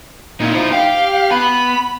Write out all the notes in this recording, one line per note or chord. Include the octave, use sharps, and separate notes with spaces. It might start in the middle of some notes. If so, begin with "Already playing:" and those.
A#2 D#4 E4
F4 C5
G4 F5
B3 B5